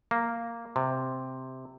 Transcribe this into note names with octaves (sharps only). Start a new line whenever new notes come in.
A#3
C3